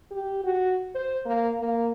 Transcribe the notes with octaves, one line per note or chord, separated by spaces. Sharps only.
G4
F#4
C5
A#3
A#3